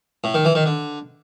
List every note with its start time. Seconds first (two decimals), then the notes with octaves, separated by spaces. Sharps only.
0.24 A2
0.34 D#3
0.45 E3
0.55 D#3
0.66 D3